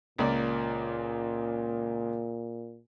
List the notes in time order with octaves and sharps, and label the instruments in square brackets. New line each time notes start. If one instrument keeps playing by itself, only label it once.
[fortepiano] C#2 A#3 D5 [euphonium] A#2